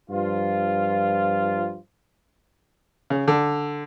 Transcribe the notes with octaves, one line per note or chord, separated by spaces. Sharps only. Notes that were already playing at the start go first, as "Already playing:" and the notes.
G2 F3 F4
C#3
D3